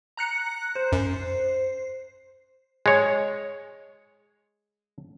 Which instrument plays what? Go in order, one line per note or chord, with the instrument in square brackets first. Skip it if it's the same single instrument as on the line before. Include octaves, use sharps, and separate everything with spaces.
[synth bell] A#5 F#6 C#7
C5
[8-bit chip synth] F#2
[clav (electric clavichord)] G#3 C#5